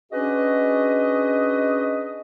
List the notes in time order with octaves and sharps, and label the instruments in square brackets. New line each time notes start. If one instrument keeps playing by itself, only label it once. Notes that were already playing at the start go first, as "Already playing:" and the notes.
[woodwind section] C#4 D4 F#4 G#4 B4 D#5